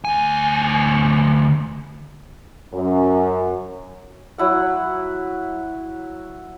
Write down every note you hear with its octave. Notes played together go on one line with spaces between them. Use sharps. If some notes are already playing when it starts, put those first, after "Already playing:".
D2 G#5
F#2
F#3 E4 F#5